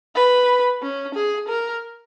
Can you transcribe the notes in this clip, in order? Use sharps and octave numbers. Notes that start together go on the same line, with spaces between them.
B4
C#4
G#4
A#4